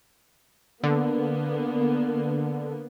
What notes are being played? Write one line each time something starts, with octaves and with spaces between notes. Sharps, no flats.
D3 A#3 B3